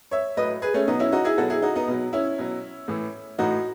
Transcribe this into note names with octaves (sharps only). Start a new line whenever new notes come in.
C#5 E5
A2 F#3 B4 D#5
G#4 B4
A3 C#4
B2 F#3 B3 D#4
C#4 E4
D#4 F#4
E4 G#4
B2 F#3 F#4 A4
E4 G#4
D#4 F#4
B3 D#4
B2 F#3
C#4 E4
B2 F#3
A2 E3
A2 E3 D#4 F#4